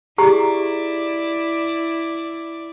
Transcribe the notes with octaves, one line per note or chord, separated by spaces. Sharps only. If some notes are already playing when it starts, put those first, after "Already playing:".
E4 G4 G#4 D5 A#5